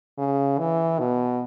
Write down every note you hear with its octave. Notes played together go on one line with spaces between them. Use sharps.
C#3
E3
B2